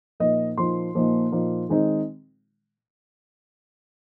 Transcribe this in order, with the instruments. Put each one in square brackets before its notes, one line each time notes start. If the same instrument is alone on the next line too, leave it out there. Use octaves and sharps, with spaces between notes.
[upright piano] A#2 F3 A#3 D#4 D#5
A#2 F3 A#3 D#4 C6
A#2 F3 A#3 D#4
A#2 F3 A#3 D#4
D#3 G#3 C4 D#4